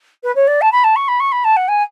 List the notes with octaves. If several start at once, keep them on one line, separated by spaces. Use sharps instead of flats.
B4
C#5
D5
A5
B5
A5
C#6
B5
C#6
B5
A5
F#5
G#5